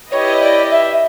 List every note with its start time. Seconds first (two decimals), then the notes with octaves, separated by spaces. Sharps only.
0.12 E4 G4 B4 C#5 D#5
0.42 D5
0.71 E5